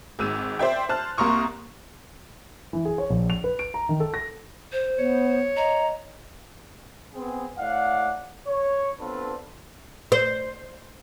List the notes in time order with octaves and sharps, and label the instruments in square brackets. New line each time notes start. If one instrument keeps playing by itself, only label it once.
[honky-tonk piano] G#1 G#2 E6 D#7
C5 D5 E5 G5
C5 A5 F6 F#6
C2 A#3 A#5 C6 C#6 D#6
[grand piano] E3
G#4
C#5
A#1
F7
B4
D7
A#5
D#3
A4
A#6
[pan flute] C5
[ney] B3 [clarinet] C#5
[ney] D#5 [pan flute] A#5
[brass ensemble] B3 C4 G#4
A2 D5 F5 F#5
C#5
B3 C4 D4 F4 A4 B4
[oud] C5